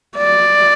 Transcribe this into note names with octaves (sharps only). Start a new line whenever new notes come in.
D5